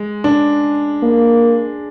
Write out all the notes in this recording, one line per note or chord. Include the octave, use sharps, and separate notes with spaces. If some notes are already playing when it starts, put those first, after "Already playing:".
Already playing: G#3
D4
A#3